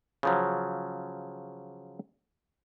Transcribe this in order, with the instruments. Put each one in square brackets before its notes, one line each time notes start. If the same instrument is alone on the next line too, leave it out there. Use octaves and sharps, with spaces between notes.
[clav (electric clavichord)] C#3 F3 F#3